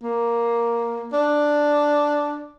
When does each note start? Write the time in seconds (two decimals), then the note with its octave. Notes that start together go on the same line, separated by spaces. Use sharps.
0.03 A#3
1.13 D4